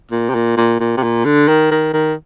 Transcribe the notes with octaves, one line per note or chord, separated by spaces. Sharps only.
A#2
C3
A#2
A#2
A#2
C3
A#2
D3
D#3
D#3
D#3